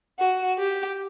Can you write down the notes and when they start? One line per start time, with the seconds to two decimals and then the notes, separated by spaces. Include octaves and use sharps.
0.19 F#4
0.58 G4